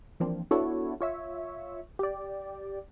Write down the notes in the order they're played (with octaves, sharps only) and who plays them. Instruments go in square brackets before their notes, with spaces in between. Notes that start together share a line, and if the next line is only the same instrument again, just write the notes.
[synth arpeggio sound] E3 F3 A#3 C4 D4
B3 D4 E4 F#4 A4 C#5
F4 C#5 E5
G4 D5